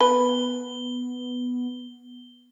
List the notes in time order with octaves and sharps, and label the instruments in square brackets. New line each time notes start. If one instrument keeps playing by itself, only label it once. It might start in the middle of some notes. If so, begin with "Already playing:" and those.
[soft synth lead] B3 [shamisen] B4 [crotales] G7